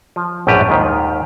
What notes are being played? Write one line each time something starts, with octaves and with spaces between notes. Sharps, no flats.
F3
A#1 F#2 A2 G3 G4 B4
D#2 G#2 D#3